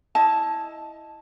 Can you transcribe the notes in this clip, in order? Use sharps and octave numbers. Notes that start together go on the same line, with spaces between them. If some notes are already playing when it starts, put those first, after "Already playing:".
E4 D#5 A5